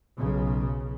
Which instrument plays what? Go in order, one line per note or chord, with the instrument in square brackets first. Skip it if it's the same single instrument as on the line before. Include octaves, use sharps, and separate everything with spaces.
[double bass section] B1 C#3